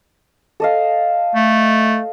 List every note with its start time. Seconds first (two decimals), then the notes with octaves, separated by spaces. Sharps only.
0.60 A4 D#5 F5
1.35 A3